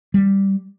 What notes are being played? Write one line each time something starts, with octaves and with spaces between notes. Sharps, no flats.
G3